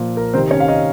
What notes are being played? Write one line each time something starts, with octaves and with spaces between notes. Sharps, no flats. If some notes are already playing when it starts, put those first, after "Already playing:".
Already playing: A#2 F3
A#4
C3 D#3 C4 C5
C#4 C#5
F5
D#4 D#5